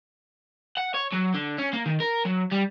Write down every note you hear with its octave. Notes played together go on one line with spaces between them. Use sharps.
F#5
C#5
F#3
D3
C#4
A#3
D#3
A#4
F#3
G3